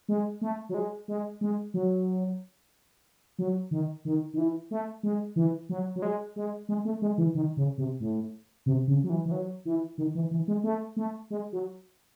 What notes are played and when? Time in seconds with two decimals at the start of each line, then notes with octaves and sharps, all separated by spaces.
0.09 G#3
0.41 A3
0.69 F#3
0.74 G#3
1.08 G#3
1.41 G#3
1.74 F#3
3.39 F#3
3.71 D#3
4.05 D#3
4.33 D#3
4.38 E3
4.71 A3
5.03 G#3
5.36 E3
5.69 F#3
5.96 F#3
6.02 G#3
6.36 G#3
6.69 G#3
6.85 A3
7.02 G#3
7.18 E3
7.35 D#3
7.57 C#3
7.78 C3
8.00 A2
8.66 C3
8.87 C#3
9.04 F#3
9.09 E3
9.25 E3
9.32 F#3
9.65 E3
9.98 D#3
10.15 E3
10.31 E3
10.48 G#3
10.64 A3
10.96 A3
11.30 G#3
11.52 F#3